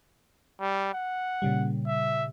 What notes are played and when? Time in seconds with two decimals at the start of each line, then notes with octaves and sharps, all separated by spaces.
0.60 G3
0.93 F#5
1.42 A#2 C#3 G3
1.87 E5